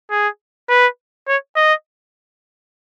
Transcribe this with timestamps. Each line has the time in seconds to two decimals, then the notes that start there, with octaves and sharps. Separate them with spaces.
0.10 G#4
0.69 B4
1.28 C#5
1.56 D#5